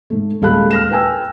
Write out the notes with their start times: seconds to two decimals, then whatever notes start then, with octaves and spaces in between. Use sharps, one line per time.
0.10 G#2 A3
0.41 D#1 G#3 A4 F5 B5 F#6
0.71 F6 A#6 E7
0.90 B4 G5 G#5 E6